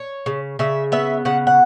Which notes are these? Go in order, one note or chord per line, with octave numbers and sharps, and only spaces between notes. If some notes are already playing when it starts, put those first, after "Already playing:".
Already playing: C#5
C#3
C#3 E5
B3 E5
C#3 F#5
F#5